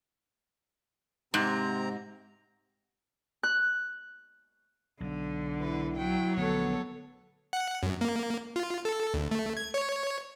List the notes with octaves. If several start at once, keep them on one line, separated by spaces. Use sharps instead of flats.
G#2 C3 C4 A#5
F#6
B1 D3
E4 B4
F#3 G5
A#1 D3 A3 B3 A4 C#5
F#5
F#2
A#3
F4
A4
D2
A3
G#6
C#5